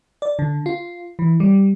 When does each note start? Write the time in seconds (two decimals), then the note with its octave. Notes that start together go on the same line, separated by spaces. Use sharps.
0.22 D5
0.39 D3
0.66 F4
1.19 E3
1.40 G3